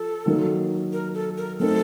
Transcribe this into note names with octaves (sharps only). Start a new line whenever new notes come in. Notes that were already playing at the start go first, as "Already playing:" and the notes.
Already playing: F3 A4
D#3 F#3 A#3 D#4
A#4
A4
A#4
F#3 A3 C4 D#4 A4 A#4